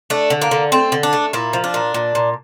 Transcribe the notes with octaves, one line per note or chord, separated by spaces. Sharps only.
A3 D4
D3
A#3
D3
A3 C4
D3
D4
A3
A#2 E4
F3
D4
A#2
A#2
A#2